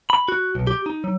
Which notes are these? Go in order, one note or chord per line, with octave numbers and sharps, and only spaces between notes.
B5
F#4
B1
G4
D#4
F#3